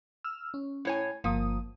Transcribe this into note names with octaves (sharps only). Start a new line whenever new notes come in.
E6 F6
C#4
A2 C#5 G#5
G1 F3 A#3 D#6